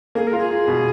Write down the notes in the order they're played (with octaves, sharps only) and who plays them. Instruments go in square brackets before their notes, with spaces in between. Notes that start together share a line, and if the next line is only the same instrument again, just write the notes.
[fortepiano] A#3 [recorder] G#4
[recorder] A#4
[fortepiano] F4 [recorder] G#4
[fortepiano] F4
B2